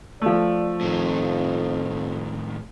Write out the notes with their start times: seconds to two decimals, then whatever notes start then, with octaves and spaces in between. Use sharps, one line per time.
0.22 F3 A3 D5
0.81 F2 A2 D#3